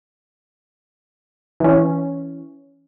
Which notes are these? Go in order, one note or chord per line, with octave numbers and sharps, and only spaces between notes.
E3 C#4